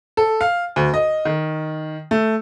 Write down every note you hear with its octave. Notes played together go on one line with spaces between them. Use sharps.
A4
F5
D2
D#5
D#3
A3